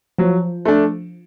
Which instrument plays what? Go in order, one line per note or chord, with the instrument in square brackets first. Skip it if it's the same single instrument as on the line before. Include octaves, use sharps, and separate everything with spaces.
[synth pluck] F3 [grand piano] F#3
[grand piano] A3 D4